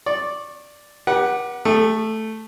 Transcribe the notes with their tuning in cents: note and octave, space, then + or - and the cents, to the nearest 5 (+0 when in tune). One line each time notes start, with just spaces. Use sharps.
D5 +0 C#6 -25
G4 +5 B4 -45 F#5 +0
A3 +0 G#4 -45